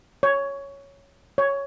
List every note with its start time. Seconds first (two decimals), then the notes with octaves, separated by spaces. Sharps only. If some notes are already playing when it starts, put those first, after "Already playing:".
0.23 C#5
1.38 C#5